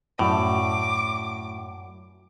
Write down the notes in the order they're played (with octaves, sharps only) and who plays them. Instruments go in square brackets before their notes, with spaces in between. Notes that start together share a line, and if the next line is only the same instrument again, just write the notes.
[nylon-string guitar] F#2 F#4 D5 [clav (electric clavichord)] A2 [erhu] D6